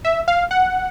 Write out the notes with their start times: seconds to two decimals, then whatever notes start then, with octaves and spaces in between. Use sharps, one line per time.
0.05 E5
0.28 F5
0.51 F#5